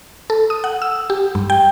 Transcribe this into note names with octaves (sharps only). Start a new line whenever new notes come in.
A4
D#6
F#5
E6
G4
G2
G5